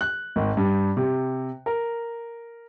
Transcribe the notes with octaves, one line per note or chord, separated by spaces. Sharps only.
F#6
G#1
G2
C3
A#4